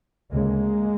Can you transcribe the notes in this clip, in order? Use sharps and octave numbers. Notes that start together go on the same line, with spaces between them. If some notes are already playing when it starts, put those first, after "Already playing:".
D2 C#3 G#3 A#3